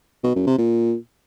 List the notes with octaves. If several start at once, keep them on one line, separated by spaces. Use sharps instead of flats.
B2
F#2
C3
A#2